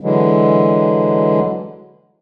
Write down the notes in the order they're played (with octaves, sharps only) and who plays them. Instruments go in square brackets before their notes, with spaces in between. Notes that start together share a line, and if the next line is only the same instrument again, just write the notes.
[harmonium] D3 E3 F#3 G#3